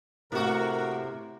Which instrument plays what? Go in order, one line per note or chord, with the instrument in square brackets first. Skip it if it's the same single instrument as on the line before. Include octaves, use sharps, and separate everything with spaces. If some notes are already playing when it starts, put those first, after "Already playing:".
[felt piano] A2 A3 [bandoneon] C3 [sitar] A#3 F#4 [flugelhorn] A#4